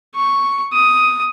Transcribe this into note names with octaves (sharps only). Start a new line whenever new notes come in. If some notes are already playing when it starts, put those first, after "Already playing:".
C#6
D#6